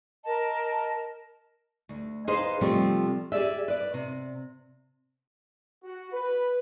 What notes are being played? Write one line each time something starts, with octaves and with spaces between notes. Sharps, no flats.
A#4 D#5 A5
D2
D#4 G#4 B4 C5 D#5 F5
C3 F3 G3 A3 C4
G4 G#4 D5 E5
B4 D5
C3
F#4
B4